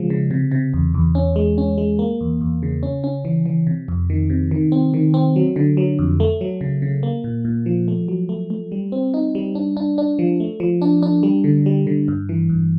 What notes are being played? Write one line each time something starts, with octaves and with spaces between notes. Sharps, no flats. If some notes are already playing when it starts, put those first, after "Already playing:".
Already playing: C#3 F3 G#3
C#3
C3
C3
E2
E2
C#4
G#3
C#4
G#3
A#3
E2
E2
C#3
C#4
C#4
E3
E3
C3
F2
D#3
C3
D#3
C4
D#3
C4
F#3
D3
F#3
F2
A3
F#3
C#3
C#3
A#3
A#2
A#2
F3
A3
F#3
A3
A3
G3
C4
D#4
G3
D4
D4
D4
F3
A3
F3
D4
D4
G3
D3
G3
D3
G2
E3
G2